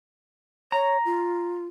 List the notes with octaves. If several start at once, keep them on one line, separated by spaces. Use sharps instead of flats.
C#5 A#5
F4